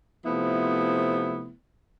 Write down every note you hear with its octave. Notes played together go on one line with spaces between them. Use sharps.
C3 F3 A3 B3 E4